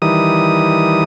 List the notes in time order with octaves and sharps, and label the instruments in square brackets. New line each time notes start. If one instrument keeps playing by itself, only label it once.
[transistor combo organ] D#3 E3 G3 D#6